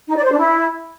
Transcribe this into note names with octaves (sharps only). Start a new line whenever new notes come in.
D#4
D5
C5
D4
E4